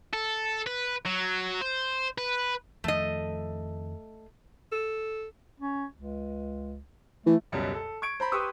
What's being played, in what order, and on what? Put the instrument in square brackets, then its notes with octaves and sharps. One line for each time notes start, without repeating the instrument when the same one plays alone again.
[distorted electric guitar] A4
B4
F#3
C5
B4
[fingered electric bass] F2 D#3 F3 [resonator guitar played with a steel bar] A3 D#5
[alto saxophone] A4
[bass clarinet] C#4
C#2
[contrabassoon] E3 [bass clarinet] A3
[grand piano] C#2 F#2 B2 F#3 G3
A4
C#6 G#6 D7
C5 A#5 B5
G4 B4 C6 C#6 D#6 E6